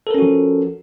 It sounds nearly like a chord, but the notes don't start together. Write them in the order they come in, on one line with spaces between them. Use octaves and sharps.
A4 A#4 C#4 F#4 F3